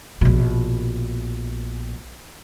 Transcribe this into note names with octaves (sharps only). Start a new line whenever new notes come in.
A#1 B2